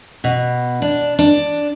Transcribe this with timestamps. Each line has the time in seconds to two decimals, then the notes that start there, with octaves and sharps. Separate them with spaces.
0.24 B2
0.82 D4
1.19 D4